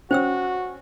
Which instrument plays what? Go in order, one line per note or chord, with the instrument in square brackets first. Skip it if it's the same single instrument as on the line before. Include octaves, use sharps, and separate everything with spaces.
[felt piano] C#4 [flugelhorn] F#4 [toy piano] C5 G5 E6